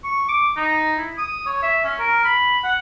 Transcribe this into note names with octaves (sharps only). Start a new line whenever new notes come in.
C#6
D6
D#4
E4
D#6
C#5
E5
C#4
A#4
B5
F#5